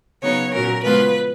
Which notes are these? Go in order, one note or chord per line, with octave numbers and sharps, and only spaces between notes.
C#3 F#3 B3 D#4 C#5
A#2 F#3 C#4 A#4
C#3 F3 G#3 B3 F4 B4